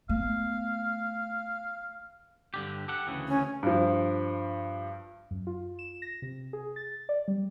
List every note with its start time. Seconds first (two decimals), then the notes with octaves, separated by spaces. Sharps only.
0.09 A3 B3 F5
2.54 G2 D3 G4
2.88 G4 A4 F#5
3.07 D2 C#3 E3
3.28 C#4
3.63 G2 F3
5.31 F#2
5.47 F4
5.79 E7
6.02 A#6
6.22 C3
6.53 G#4
6.76 A6
7.09 D5
7.28 G3